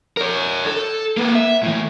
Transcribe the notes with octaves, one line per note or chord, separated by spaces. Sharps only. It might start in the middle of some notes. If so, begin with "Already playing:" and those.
A#4 C#5
A4
A#3 B4
E5
A2 E3